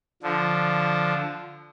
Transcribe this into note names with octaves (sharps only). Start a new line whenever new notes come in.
D3 F3